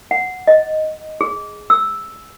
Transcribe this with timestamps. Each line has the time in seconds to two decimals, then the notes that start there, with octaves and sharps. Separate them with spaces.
0.11 F#5
0.47 D#5
1.21 G#4
1.70 E6